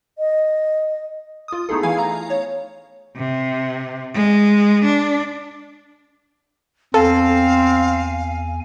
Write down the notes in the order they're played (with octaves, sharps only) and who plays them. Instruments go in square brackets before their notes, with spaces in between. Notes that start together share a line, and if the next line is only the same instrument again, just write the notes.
[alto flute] D#5
[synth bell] F4 D#6
A3 B3 D#4 E4 G#4 A4
E3 E4 F5 G#5 G#6
F5 A#5
C#5
[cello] C3
G#3
D4
[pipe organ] E2 G#5 [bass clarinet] C4 [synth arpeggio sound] A4 [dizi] F5